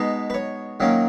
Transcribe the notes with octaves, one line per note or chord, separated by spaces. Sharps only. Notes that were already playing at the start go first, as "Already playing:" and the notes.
Already playing: B2 G#3 D#4 B4
B4
C#5
D#3 F#3 A#3 C#4